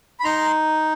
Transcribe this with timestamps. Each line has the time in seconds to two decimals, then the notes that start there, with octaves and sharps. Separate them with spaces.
0.20 B5
0.24 D#4 A#5 C6